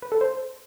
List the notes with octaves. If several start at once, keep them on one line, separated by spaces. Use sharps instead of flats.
B4
A4
C5